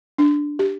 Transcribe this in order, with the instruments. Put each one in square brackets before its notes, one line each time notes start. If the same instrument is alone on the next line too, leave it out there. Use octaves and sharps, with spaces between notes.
[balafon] D4
G4